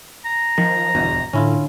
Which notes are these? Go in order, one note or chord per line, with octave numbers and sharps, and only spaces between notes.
A#5
D#3 F3
G1 E2 B2
A2 D3 C#4 E4 F4